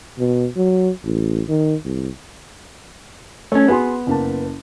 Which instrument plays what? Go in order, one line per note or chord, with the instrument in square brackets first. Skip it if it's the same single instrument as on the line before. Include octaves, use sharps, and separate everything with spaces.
[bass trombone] B2
F#3
A1
D#3
C2
[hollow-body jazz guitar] A3 C#4 [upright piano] C#5
[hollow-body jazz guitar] B3 [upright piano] F#4 G#4 C6
[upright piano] F#1 A#3 A5